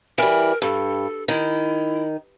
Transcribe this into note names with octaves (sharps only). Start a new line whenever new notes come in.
E3 G3 A#4
G2 A4
D#3 E4